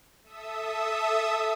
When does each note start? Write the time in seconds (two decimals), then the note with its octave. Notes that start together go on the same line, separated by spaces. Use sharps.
0.23 A4 E5 D#6 E6